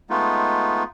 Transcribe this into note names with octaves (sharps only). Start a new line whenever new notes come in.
G#3 A3 B3 D#4 F4